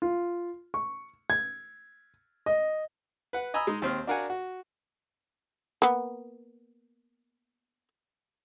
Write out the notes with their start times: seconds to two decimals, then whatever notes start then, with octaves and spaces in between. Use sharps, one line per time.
0.02 F4
0.74 C#6
1.30 G#6
2.46 D#5
3.33 B4 F#5
3.54 D#5 G#5 A#5 B5 D#6 E6
3.67 G#3 D#4
3.82 D#2 C4 C5 F6
4.07 D4 F#4 A#4 F5 F#5 G#5
4.30 F#4
5.82 A#3 B3